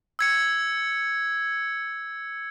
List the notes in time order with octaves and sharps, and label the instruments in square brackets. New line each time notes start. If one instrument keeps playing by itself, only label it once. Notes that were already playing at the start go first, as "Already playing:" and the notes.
[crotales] E6 G#6 C#7